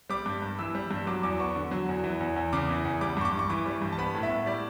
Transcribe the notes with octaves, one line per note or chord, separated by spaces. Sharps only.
G3 D6
G2
G2
E3 E6
G3
G2
F#3 D6
E2 D6
B3 C#6
D3
F#3
E2
E3
E2
E2
C#3 D6
E3
E2
G3 D6
G2 C#6
D6
G2
C#6
E3 D6
G3
G2
A5
B3 B5
A2
E5
A2
G3 D5